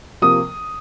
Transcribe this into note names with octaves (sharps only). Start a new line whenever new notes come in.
C3 F3 A#3 D#6